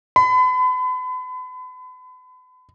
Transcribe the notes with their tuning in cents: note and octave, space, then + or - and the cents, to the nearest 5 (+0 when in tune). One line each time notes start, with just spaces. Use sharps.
B5 +40